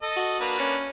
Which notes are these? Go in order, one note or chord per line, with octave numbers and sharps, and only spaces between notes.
A4 D#5
F#4
A#3 D4 B4
C#4